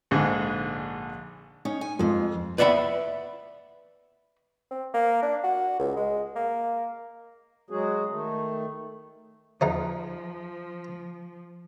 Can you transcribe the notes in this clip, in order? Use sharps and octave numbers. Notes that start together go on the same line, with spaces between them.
A#1 G#2 D3 G#4
C#4 D#4 C#5
G#5
F2 G#3 F4
B4 D5 E5 F#5 B5
C4
A#3
D4
F#4
C#2
G#3
A#3
F#3 G#3 F#4 G#4
D#3 A3
E2 F3 D#4 C5